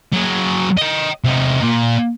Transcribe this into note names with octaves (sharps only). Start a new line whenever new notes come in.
F#3 G#4
D#5 G5
C3 D#4
A#2